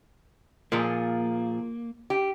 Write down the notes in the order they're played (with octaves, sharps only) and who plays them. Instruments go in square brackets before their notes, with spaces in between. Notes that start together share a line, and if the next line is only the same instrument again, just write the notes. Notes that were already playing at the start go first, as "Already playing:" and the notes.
[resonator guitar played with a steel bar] A#2 F3 G#4 [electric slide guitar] A#3
[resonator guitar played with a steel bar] G4